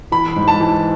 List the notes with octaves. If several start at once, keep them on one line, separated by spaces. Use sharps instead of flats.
E3 B5
G#2
A5
E3